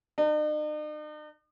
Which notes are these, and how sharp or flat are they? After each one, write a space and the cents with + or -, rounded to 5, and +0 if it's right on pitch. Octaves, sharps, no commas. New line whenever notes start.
D#4 -45